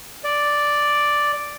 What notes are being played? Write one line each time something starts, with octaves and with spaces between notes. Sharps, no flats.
D5